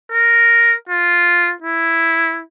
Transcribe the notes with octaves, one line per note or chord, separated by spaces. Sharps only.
A#4
F4
E4